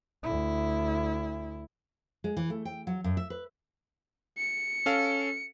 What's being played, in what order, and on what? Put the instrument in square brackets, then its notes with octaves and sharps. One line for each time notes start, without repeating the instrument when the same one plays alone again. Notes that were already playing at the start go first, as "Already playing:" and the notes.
[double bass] D2 E4
[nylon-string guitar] G#3
E3
A3
G5
F#3
F#2
E5
B4
[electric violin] C#7
[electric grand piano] C#4 A4 F5